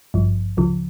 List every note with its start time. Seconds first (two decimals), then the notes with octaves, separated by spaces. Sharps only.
0.14 G#1 G2 F3
0.57 C#2 C#3 F3